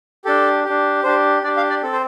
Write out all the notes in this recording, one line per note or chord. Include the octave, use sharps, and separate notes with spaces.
D4 G4 A4
D4 G4
D4 G4 C5
D4 G4 D5
F5
D5
C4 A4
C5